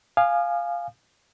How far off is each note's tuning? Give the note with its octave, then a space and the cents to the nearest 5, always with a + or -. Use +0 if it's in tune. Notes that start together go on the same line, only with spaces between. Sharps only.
F5 +0 G#5 +0 D#6 -40